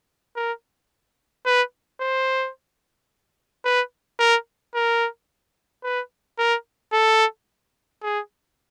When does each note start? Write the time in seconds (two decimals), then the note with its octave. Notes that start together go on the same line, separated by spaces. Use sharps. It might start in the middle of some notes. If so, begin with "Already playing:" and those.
0.36 A#4
1.46 B4
2.00 C5
3.65 B4
4.19 A#4
4.75 A#4
5.84 B4
6.38 A#4
6.93 A4
8.03 G#4